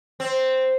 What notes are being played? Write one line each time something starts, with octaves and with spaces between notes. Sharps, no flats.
C4